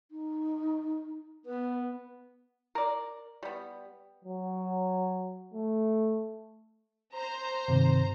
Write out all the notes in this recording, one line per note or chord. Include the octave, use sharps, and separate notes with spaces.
D#4
B3 B4
A#4 D5
G3 B3
F#3
A3
C5 A#5
G2 C3 D#3